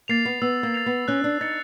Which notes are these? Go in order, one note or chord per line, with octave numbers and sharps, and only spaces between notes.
A#3 A6 C7 F7
B3
B3 E6
A#3
A6 C7 F7
B3
C#4 F#6
D4
D#4 A6 C#7